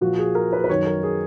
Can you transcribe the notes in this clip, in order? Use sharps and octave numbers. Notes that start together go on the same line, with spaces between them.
A#2 F3 F#4
G#4
A#4
B4
B4
F#2 D#3 F#3 C#5
A#4
G#4